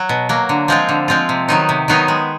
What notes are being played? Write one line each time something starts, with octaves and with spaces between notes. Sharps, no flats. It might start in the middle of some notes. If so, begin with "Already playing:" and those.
Already playing: F#3
B2
F#3 A#3
D3
F3 G#3 C4 F4
D3
F3 G#3 C4 F4
C3
D#3 F#3 B3 D#4
C3
D#3 F#3 B3 D#4
G#3